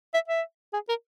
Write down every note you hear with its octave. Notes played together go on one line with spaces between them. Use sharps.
E5
E5
G#4
A#4